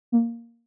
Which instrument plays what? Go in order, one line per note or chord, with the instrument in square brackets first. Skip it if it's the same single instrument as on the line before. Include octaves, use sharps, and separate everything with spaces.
[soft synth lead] A#3